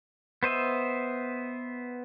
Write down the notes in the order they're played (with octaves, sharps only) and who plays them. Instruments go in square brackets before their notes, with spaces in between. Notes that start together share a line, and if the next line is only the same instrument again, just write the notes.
[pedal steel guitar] B3 C5 D#5 E5